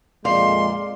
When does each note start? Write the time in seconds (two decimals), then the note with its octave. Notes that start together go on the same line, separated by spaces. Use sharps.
0.25 F2 A#2 G#3 D5 F5 C6